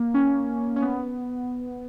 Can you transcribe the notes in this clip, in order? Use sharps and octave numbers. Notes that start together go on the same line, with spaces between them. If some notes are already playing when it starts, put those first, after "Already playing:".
Already playing: A#3
C#4
C#4
B3